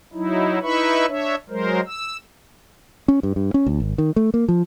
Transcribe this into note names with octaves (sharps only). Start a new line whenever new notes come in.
F#3 D#4 E4
D#4 E4 B4 E5 B5 C#6
D4 C#5 E5
F#3 G#3 A#4 C5
E6
C#4
G2
G2
C#4
D2
G#1
D#3
A3
A#3
F3